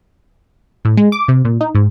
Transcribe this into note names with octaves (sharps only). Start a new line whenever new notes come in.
A2
G#3
D6
C3
A#2
D#4
G#2